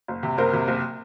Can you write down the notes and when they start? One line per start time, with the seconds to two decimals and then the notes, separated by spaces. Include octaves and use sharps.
0.08 F#1
0.23 C3
0.38 F#1 A#4 C5
0.53 C3
0.68 F#1